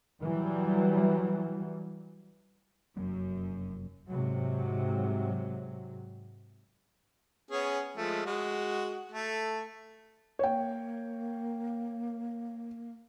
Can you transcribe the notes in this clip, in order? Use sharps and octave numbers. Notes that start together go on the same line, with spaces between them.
E3 F#3 G3
F1 F#2 F#3 A#3
G#2 C3 F#3
B3 C#4 G#4
F3 G#3 A3
G#3 F#4
A3 A4
A#3 C#5 G5